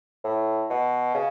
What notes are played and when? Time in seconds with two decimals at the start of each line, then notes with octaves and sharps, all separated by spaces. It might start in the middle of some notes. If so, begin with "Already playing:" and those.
0.24 A2
0.70 B2
1.15 C#3